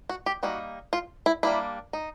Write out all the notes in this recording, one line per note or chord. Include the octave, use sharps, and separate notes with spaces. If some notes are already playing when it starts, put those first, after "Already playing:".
F#4
G4
G3 A#3 D#4 F#4
F4
E4
G3 A#3 D4 E4
D#4